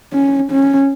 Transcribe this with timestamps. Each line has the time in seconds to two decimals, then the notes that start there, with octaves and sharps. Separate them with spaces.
0.13 C#4
0.51 C#4